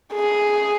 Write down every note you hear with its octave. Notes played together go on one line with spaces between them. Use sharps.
G#4